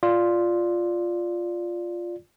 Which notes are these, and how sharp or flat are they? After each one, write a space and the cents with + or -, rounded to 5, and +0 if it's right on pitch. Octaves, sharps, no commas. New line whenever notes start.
F4 +0 D5 +0